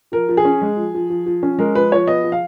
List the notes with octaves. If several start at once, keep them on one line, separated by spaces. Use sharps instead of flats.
F3 A#4
F3
G#4
C#4
G#3
F3
F3
F3
F3
C#4
G#3 A#4
F3 B4
F3 C#5
B3 D#5
F3
F5